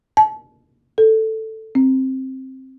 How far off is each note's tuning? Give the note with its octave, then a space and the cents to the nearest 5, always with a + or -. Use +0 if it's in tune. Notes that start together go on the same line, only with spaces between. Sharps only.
A5 -35
A4 +5
C4 +10